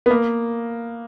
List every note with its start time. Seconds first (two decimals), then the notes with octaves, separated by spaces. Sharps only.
0.06 B3
0.11 A#3